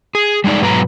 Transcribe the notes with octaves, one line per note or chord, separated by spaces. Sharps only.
G#4
G3 G#3 C4 D#4 D5
G#2 B2 F#3 B4 A#5